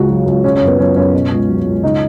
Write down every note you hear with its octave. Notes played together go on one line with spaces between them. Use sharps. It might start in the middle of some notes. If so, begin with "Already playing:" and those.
Already playing: C#2 C#3 F#4
F#3
C#2
C#3 C#4
C#4
F#2
B3
F#3 C#4
F#2 C#4
B2
C#2
F#3
C#2
C#3 D#4